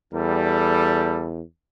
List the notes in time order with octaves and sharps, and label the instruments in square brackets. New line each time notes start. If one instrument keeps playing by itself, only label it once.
[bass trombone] E2 [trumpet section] G3 A4